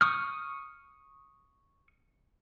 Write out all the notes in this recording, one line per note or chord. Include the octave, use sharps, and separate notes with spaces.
C#6 D#6 F6